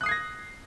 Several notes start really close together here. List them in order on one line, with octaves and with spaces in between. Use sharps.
F#6 D#6 C7 G#6 A#6